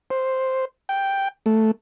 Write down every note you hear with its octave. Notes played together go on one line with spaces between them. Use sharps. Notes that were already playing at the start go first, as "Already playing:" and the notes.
C5
G5
A3